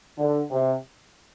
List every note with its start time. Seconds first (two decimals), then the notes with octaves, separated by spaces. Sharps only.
0.18 D3
0.50 C3